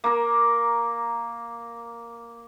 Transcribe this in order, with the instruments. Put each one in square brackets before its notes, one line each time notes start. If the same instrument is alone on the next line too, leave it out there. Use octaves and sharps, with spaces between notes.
[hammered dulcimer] A#3 A#4